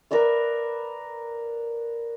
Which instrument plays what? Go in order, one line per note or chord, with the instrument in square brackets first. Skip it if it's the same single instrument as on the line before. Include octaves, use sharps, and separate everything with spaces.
[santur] A#4 B4 D5 E5